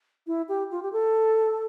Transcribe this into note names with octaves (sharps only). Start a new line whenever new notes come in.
E4
G4
F4
G4
A4